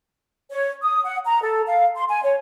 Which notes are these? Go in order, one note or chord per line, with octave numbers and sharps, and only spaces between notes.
C#5
D#6
F#5
A#5
A4
F5
C6
G#5
C#5